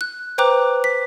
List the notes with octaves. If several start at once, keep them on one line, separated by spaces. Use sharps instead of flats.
F#6
B4 C5 G5 A#5 D6 F#6
B6